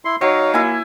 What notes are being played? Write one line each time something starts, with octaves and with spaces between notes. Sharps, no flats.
E4 C6
F#3 D#4 C#5 F5
A#3 E4 G#5